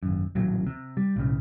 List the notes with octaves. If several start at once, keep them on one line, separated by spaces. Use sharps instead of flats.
G#1 F#2
D#1 A1 F#3
C3
G3
B1 A2 C#3